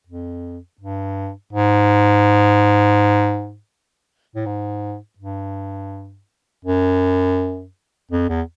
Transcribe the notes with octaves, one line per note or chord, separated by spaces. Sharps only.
F2
G2
G#2
A2
G#2
G2
F#2
F2
E2